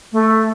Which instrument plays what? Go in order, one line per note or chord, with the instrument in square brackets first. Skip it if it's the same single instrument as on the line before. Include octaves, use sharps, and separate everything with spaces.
[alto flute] A3